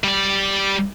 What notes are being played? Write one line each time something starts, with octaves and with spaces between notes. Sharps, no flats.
G3 D5